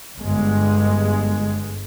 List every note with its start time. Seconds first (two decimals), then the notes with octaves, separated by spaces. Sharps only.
0.17 G1 G#3